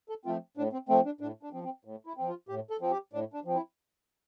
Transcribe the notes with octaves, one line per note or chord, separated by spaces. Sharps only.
A4
F3 A3 C4 F4
A2 D4
C4
F3 A3 C4
D4
A2 D4
D4
F3 C4
C4
A2
E4
F3 C4
F4
A2 G4
A4
F3 C4
G4
A2 D4
D4
F3 C4
E4